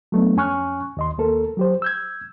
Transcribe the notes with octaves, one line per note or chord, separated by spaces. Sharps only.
F#3 A3 B3 D4
F2 C#4 G#5 C#6 F6 F#6
D#2 D#5 C6
D#2 A#3 A4 A#4
F#3 G4 C5
E6 G6 G#6